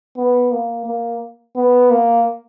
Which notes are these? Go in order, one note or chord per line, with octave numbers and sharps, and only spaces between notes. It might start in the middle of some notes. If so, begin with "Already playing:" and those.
B3
A#3
A#3
B3
A#3